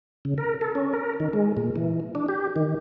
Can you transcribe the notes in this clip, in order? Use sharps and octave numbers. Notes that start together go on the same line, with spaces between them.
C#3
A#4
A4
C#4
A#4
D#3
G#3
A#2
E3
D4
G4
D#3